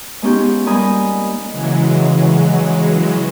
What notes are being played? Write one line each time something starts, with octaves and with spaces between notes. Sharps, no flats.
G#3 B3 C#4 D#4 F4 G4
G3 A#3 D#5 G#5 B5 D#6
C#3 E3 F#3 G#3